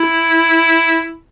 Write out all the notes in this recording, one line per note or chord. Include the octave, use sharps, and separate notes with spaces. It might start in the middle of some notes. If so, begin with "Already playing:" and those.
Already playing: E4